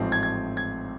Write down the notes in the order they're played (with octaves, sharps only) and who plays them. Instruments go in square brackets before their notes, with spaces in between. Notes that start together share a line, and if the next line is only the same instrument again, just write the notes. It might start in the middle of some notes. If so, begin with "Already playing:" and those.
Already playing: [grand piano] A1 G#2 F3 A3 C4
G#6
G#6
G#6